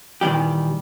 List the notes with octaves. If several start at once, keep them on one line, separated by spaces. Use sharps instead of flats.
A#2 D#3 E3 G3 G4